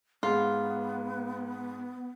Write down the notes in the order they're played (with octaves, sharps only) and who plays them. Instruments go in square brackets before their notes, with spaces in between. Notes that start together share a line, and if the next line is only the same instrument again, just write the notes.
[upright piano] G#2 [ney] B3 [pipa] F4